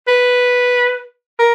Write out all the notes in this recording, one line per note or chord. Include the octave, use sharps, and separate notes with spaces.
B4
A#4